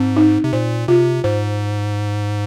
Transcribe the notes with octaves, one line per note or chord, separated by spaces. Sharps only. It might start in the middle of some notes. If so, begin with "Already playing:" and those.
Already playing: G#2 C4
D#4
C3
A#2 C5
C3 F4
G#2 C5